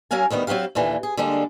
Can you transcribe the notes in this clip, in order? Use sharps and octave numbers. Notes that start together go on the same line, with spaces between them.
F#3 C#4 A#4 F5 G#5
D2 D#3 G3 B3
F#3 A#3 C4 G4 F5
D#2 A#2 D3 E3
G#4
D3 G3 G#3 A#3 D4